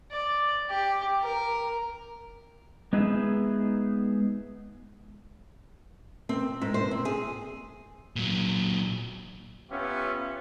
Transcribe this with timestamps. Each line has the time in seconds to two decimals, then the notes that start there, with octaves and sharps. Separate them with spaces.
0.11 D5
0.69 G4
1.22 A#4
2.93 G#3 B3 D#4 G#4 B4 E5
6.29 C4
6.61 G#2
6.74 C5
6.91 C4
7.05 G#4
8.16 A#2 F#3
9.71 B3 C#4 F4 G4 E5